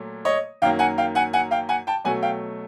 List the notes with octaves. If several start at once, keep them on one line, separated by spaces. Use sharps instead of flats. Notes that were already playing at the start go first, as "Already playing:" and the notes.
Already playing: A#2 F#3 A3
C#5 D#5
F#2 D#3 F#3 A#3 F5 G5
F#5 G#5
F5 G5
F#5 G#5
F#5 G#5
F5 G5
F#5 G#5
G5 A5
B2 F#3 A3 F#5 G#5
F5 G5